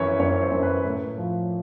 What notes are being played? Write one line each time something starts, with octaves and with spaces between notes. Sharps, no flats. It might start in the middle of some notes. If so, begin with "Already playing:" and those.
Already playing: F#2 E3 C#5
F#2 C#5
C5
F#2
B4
A2
F3